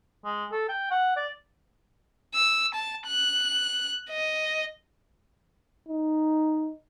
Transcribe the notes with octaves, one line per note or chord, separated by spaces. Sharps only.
G#3
A4
G5
F#5
D5
E6
A5
F#6
D#5
D#4